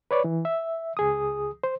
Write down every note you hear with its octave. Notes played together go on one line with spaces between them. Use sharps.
B4 C#5 D5
E3
E5
C#2 G#4 D#6
C5